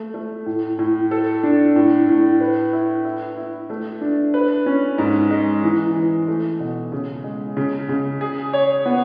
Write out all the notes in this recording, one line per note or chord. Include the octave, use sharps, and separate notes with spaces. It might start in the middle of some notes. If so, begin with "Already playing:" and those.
Already playing: A3
A3
A2
A2
A4
D4
A2
A2
B4
E4
E4
E4
A3
D4
B4
C#4
G#2
G#3
E3
E3
A3
B2
C#3
G#3
C#3
C#3
G#4
C#5
B3